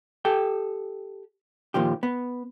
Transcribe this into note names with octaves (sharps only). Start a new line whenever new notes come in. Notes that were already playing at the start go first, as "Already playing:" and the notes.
G4 A4 G5
A#2 D#3 F3 G4
B3